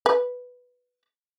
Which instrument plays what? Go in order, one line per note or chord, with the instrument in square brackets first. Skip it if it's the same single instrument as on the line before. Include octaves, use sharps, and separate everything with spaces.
[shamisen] B4